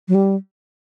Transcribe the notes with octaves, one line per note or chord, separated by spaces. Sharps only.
F#3
G3